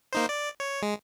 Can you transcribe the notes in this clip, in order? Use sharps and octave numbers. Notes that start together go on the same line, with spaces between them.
A#3 D#4 C5
D5
C#5
G#3